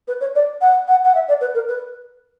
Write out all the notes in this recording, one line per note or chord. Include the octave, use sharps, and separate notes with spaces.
B4
C#5
D5
F#5
F#5
F#5
E5
D5
B4
A#4
B4